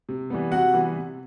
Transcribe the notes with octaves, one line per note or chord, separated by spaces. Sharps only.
C3
E3 G3 B3
C3 F#4 F#5
E3 G3 B3
C3